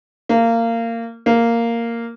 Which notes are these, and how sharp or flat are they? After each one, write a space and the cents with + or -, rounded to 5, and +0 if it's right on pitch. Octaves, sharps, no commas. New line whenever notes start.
A#3 -20
A#3 -5